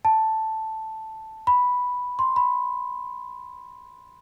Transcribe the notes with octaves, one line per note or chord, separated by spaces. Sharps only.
A5
B5
C6
B5